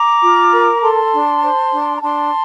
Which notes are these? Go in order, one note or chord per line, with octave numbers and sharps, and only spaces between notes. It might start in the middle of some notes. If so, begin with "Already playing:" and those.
Already playing: A#5 D6
F4
A#4
A4 A5 C6
D4
C5
D4
A#5
D4 A5 C6